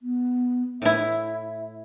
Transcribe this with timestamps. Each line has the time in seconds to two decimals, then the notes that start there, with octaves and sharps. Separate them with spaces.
0.02 B3
0.82 A2 E4 E5